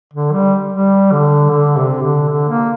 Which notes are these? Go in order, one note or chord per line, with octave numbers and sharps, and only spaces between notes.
D3
G3
G3
D3
D3
C3
D3
D3
A#3